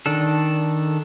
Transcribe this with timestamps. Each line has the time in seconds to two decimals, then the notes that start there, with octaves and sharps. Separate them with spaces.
0.06 D#3 D4 A4